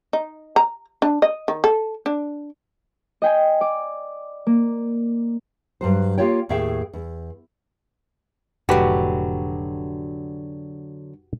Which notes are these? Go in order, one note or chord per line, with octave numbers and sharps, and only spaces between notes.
D#4
A#5
D4
D#5
D#3
A4
D4
D#5 G5 G#5
D5
A#3
G2 F#3 C5
A#3 F4 G4 C#5 G5
D#2 A2 G#4 E5 F5 G5
E2
F1 A2 D3 F#3 F#4 G4 B4